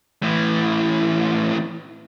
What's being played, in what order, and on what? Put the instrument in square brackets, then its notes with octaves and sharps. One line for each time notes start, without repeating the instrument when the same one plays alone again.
[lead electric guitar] A2 E3